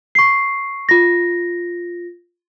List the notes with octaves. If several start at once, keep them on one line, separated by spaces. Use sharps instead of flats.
C#6 C7
F4 A#6